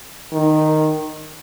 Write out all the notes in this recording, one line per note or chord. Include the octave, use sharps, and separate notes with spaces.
D#3